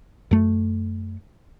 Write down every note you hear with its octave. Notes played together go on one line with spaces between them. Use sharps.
F#2 A3